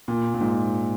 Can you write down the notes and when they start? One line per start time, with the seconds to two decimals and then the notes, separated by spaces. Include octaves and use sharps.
0.08 A#2
0.34 A#2
0.41 G#2